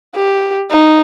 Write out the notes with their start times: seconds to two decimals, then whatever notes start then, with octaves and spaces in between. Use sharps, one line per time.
0.15 G4
0.71 D#4